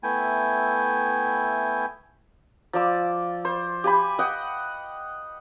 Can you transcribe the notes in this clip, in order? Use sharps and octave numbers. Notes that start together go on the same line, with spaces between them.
A3 B3 E4 G5 G#5
F3 D5 E6
C5
G4 G#5 B5
D#5 F#5 G5